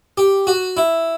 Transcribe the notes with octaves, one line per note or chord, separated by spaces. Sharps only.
G4
F#4
E4